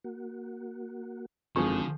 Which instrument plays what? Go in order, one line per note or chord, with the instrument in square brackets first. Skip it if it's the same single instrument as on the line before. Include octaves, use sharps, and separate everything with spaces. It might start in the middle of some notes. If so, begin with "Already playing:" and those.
[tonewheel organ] A#3 F#4
[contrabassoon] G#1 [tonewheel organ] F#2 A4 G6 [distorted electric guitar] D3 [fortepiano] F3 G#4 C#6